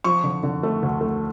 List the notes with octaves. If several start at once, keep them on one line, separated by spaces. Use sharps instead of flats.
F3 C#6
D3
D3
A3
D2
A3